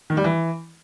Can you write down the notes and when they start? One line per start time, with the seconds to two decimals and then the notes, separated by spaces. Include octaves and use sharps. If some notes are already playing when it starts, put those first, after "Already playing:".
0.10 D#3
0.17 G3
0.24 E3